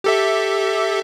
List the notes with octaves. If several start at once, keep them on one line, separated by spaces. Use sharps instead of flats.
G4 A4 E5